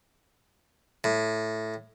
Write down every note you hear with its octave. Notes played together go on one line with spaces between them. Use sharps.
A2